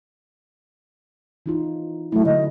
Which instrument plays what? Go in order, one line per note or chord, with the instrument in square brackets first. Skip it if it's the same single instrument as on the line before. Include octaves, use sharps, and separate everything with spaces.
[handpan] E3 D#4 F4
[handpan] F#3 E4 [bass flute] A3
[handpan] D3 [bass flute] D#5